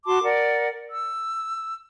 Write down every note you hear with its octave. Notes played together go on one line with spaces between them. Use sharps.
F#4 A5 C6 D6
A#4 D5 F#5
E6